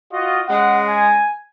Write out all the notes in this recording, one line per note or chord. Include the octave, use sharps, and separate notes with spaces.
F4 F#4 D#5
C#3 G#3 F#5
G#5